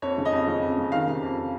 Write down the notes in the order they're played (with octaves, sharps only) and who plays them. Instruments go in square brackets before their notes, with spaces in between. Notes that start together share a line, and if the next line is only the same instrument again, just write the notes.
[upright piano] F2 C#5
C#3
D#5
F2
C#3
F2
C#3
D#3 F5
C3
F2